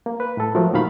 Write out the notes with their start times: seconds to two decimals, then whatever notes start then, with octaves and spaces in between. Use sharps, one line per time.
0.06 A#3
0.20 B4
0.37 A2 A4
0.55 F3 F#3 A3 A#4
0.73 E2 A#2 D#3 F#3 F5 B5